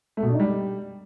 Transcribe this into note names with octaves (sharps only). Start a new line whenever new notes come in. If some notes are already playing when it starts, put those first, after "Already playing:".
A3
B2
D4
D#4
G3